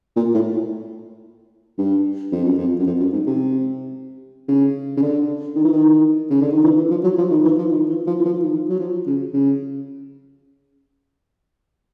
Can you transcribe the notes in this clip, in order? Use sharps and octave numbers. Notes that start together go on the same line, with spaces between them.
A#2
A2
G2
F2
F#2
F2
F#2
F2
F#2
G#2
C3
C#3
C#3
D3
D#3
E3
D#3
C#3
D3
D#3
E3
E3
F3
F#3
F3
D#3
E3
F3
D#3
E3
F3
E3
F3
D#3
F#3
F3
C#3
C#3